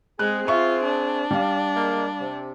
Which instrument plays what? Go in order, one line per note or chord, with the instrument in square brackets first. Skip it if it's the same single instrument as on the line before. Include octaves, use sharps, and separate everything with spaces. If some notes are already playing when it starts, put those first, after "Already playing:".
[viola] G#3 [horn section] C4 G#4 [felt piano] F#6
[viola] F4 [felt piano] E5 C#6
[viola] D4
[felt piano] G3 F5
[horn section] G#3 A#3
C3